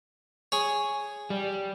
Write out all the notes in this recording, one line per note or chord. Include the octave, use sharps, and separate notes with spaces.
G#4 C#5
G3